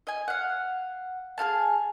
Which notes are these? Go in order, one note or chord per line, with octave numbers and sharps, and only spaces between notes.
D#5 G#5
F5 F#5
G#4 A4 F5 A5